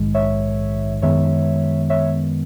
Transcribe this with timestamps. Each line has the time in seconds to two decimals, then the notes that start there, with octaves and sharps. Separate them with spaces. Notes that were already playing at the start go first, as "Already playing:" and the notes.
Already playing: A#1 G#2 D#3 G#3
0.14 C#5 E5
1.02 F#2 D#3 G#3 B3 C#5 E5
1.90 C#5 E5